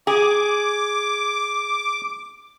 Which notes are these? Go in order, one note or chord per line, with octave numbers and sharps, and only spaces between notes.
G#4 D6